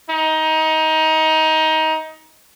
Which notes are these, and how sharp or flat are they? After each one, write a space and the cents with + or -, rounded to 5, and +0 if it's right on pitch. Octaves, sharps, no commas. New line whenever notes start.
D#4 +20